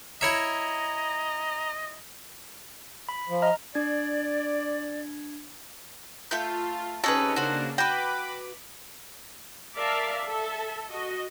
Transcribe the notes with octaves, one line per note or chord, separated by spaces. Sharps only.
E4 C#5 D#5 E5 A#5
B5
F3
D#5 A#5 F6
D4 D5 G#6
A3 F4 E5 G6
C3 C#4 D#4 F#4 G#4 A4 B4
C#3 A#3 D4 F#4 C5
F#4 B4 G5 B5 D6
A#4 D5 E5 F5 A5
A4 E5
F#4 D#5